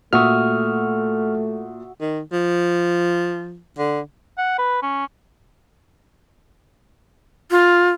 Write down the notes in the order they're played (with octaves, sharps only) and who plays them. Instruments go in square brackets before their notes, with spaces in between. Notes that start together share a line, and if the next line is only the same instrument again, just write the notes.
[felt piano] A#2 [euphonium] A3 [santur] F#4 E5 D#6 [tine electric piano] C#6 F6
[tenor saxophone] D#3
F3
D3
[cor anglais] F#5
B4
C#4
[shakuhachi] F4